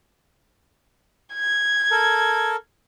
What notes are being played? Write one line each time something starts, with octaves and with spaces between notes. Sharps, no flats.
G#6
A4 A#4